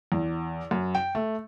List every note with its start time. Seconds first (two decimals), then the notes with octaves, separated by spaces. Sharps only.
0.12 E2
0.71 F#2
0.95 G5
1.15 A3